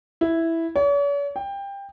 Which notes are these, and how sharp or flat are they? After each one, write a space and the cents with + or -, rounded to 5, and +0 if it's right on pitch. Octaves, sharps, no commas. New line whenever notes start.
E4 +0
C#5 +45
G5 +20